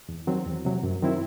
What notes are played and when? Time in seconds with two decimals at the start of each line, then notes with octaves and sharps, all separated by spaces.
0.09 E2
0.27 D#3 F#3 C4
0.46 E2
0.65 C3 F#3
0.83 F#2
1.02 D#3 F#3 C4 E4